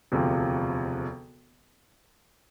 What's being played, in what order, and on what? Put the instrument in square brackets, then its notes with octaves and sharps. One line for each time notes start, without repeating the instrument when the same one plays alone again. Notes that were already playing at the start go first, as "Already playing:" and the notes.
[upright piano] E1 D2 C3 F3